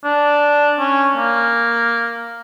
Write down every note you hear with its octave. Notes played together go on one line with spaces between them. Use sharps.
D4
C#4
A#3